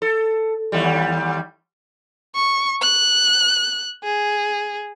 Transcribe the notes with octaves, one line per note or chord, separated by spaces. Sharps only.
A4
D#2 G3
C#6
F#6
G#4